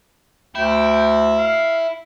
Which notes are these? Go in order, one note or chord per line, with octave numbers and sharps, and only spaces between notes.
D2 E4 G5
F5